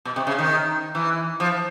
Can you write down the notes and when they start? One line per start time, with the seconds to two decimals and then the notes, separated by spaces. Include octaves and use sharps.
0.05 B2
0.16 C3
0.27 C#3
0.39 D#3
0.95 E3
1.40 F3